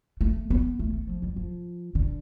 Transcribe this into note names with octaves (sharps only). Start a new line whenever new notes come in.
A3
B3
A3
A3
F3
G3
F3
D3